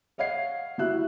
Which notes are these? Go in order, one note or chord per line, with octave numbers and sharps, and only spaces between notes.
C#5 D#5 F5 F#5 G#6 C7
G3 E4 F#4 E5 F#6